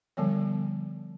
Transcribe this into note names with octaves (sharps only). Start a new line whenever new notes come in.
D3 F3 G3 B3 C#5